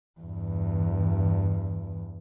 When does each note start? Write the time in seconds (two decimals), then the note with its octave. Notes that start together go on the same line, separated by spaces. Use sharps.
0.20 E2 G2